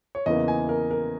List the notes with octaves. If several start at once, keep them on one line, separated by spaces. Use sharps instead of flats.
C#5
E2 C#3 E3 A#3 D#5
G#5
A#4
A#4